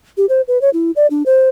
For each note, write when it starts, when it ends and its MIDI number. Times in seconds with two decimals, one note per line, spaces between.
0.17 0.26 67
0.29 0.41 72
0.48 0.61 71
0.62 0.70 73
0.73 0.91 64
0.96 1.07 74
1.10 1.23 62
1.26 1.49 72